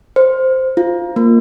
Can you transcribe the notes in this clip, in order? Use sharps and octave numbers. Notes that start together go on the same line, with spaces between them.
C5
F4
A#3